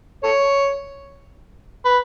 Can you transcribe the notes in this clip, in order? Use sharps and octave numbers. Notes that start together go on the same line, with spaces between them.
A4 C#5
B4